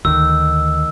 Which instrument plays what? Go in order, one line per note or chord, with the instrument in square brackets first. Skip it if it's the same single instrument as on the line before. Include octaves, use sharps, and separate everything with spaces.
[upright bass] D2 [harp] D#3 [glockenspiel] E6